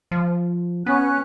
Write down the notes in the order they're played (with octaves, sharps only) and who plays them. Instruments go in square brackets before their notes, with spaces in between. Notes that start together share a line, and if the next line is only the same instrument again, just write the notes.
[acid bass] F3
[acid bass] B3 [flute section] C#4 F#6